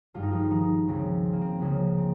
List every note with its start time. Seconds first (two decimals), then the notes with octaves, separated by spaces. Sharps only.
0.14 G#1 G2 G3 F4
0.23 D#4
0.32 F3 F4
0.51 D#3 D#4
0.88 C#2 C#3 F3 C4
1.25 C4
1.33 A#3
1.41 C4
1.60 C#2 C#3 F3 A#3
1.98 C4